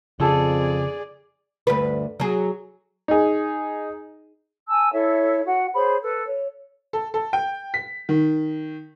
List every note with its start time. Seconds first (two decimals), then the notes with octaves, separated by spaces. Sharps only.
0.20 F2 C#3 F4 G#4 A4 D5
1.67 D2 G2 B4
2.20 F#3 G#4
3.08 D#4 G#4
4.69 G#5 A5 E6
4.92 E4 A4 C#5 E5
5.46 F#4 F#5
5.73 G#4 C5 C#5 B5
6.01 A4 B4
6.24 C#5
6.93 A4
7.14 A4
7.33 G5
7.74 B6
8.09 D#3